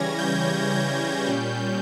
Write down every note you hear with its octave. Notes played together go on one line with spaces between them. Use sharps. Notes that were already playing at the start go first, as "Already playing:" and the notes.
Already playing: C#3 E3 G3 C#4 G#6 A#6
G6
G6
A#2 G3 C#4